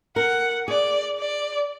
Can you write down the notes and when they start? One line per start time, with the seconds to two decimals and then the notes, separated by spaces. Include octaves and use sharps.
0.16 A#4 F#5
0.68 G#4 D5
1.19 D5